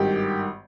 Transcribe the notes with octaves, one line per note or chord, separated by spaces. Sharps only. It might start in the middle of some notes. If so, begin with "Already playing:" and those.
Already playing: G#1 G2 D#3 G4